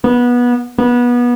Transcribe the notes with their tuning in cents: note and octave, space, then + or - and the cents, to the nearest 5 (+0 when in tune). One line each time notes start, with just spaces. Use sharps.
B3 -20
B3 -25